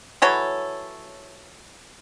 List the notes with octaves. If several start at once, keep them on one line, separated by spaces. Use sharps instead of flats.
E3 F#3 A4 C#5